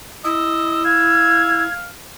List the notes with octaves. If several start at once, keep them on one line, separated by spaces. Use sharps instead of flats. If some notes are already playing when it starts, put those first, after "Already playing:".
E4 D#5 E6
F5 G#6